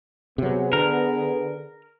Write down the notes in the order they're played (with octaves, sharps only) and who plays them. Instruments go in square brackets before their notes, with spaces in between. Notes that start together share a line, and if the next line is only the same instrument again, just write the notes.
[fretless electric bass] C3 F#3 [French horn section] B3 G#4
[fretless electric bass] D3 [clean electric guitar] A#4